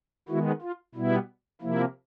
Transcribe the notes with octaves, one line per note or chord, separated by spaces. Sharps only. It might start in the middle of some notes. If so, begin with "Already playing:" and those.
D#3 G#3 B3 E4 F#4
F4
B2 G3 B3 E4
C3 F3 A#3 E4